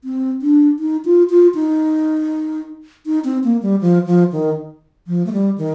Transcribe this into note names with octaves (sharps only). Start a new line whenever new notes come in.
C4
D4
D#4
F4
F4
D#4
D#4
C4
A#3
G3
F3
F3
D#3
F3
A3
G3
D#3